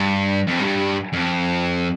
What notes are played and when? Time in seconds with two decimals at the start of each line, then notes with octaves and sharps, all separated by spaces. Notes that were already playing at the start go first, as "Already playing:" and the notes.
Already playing: G2
0.47 F2
0.60 G2
1.13 F2